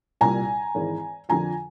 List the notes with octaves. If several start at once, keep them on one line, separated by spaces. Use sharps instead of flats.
C2 A#2 G3 G#5 A#5
G#1 G#2 E3
F2 D3 F3 G#5 A#5